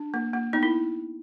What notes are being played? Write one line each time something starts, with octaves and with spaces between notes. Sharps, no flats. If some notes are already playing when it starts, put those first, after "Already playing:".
Already playing: D4
A#3
A#3
B3 D#4
E4